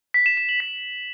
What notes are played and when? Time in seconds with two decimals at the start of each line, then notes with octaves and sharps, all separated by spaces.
0.14 B6
0.26 E7
0.37 E7
0.49 F#7
0.60 B6